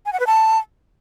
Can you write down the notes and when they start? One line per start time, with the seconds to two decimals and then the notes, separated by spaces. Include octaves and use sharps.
0.06 G#5
0.13 F#5
0.20 B4
0.27 A5